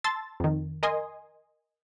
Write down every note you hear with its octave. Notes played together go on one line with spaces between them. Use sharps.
A5 C6 E6 A6
F2 D#3
A#4 D#5 G#5 C6 D#6